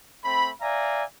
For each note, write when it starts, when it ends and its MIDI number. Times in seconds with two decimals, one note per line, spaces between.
0.24 0.50 57
0.24 0.50 60
0.24 0.50 83
0.61 1.04 74
0.61 1.04 76
0.61 1.04 77
0.61 1.04 80
0.61 1.04 82